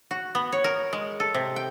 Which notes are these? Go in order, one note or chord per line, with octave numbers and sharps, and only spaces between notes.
F#4
B3
C#5
A#4
G#3
A4
C3
G5